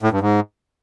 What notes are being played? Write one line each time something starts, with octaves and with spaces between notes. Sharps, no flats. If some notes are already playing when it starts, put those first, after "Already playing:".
A2
G2
G#2